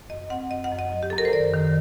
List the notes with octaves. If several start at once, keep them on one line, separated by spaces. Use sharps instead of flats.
F#2 D#5
C4 F#5
F#2 D#5
F#5
F#2
D#5
F#3
G4
A4
F#2
A#4
C5
D#3 D5
D#3